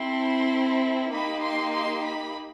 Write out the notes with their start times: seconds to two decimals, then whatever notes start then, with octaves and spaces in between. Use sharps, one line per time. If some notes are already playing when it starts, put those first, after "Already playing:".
Already playing: C4 E4 A4 C6
1.11 A#3 D#4 G4 B5
1.43 C6
1.73 C6
2.04 B5